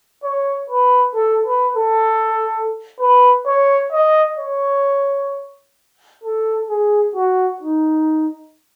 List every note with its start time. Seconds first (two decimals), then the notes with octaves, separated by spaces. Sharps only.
0.24 C#5
0.70 B4
1.15 A4
1.46 B4
1.77 A4
2.99 B4
3.47 C#5
3.92 D#5
4.38 C#5
6.23 A4
6.69 G#4
7.15 F#4
7.62 D#4